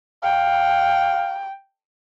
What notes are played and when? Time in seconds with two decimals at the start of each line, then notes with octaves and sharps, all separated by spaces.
0.24 F5 G5